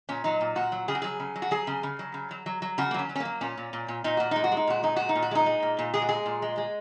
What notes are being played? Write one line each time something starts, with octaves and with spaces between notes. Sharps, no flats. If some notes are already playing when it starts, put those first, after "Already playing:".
A#2 C#4
F#3 D#4
A#2
A#2 F#4
F#3
C#3 G#4
F#4
F#3 G#4
C#3
F#3
F#4
F#3 G#4
C#3
C#3
F#3
C#3
F#3
F#3
F#3
C#3 F#4
A#3
F#3 C#4
F#3
C#4
F#3 A#3
A#2 C#4
A#2
A#2
A#2
A#2 D#4
A#2 F#4
G#3 D#4
F#4
G#3
D#4
A#2 F#4
G#3 D#4
A#2 F#4
D#4
A#2
F#4
G#3 D#4
G#3
A#2
A#2
G#3 G#4
F#4
G#3 G#4
A#2
G#3
G#3